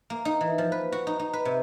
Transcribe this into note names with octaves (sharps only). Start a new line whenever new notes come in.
A#3
D#4
E3
F3
B4
F#4
D#4
D#4
B4
C3